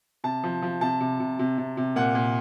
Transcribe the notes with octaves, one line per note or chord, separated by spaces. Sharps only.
C3 A5
F3
F3
C3 A5
C3
C3
C3
C3
C3
A#2 F#5
A#2